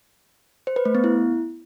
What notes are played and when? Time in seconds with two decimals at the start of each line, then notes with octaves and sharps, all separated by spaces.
0.67 C5
0.76 B4
0.85 A3
0.95 B3
1.04 E4